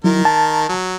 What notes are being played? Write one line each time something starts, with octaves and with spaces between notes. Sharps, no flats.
D#3 F#3 E4 A#4
A5
F#3